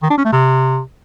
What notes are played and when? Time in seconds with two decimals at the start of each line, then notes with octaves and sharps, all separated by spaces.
0.02 D#3
0.10 D4
0.17 C#4
0.25 A3
0.32 C3